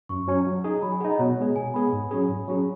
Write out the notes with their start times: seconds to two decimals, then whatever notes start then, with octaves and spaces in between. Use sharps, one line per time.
0.09 F#2 C#6
0.28 F#3 C#4
0.46 F#3
0.64 D#4 G#4
0.82 F#3 B5
0.92 G#5
1.01 G#4 F#5
1.05 D#4
1.11 D#5
1.19 B2 C#5
1.38 G#3 B3 G#4
1.56 B2 G#5
1.74 G#3 B3 G#4 B5
1.92 G#2
2.11 F#3 C#4 G#4
2.29 G#2
2.48 F#3 C#4 G#4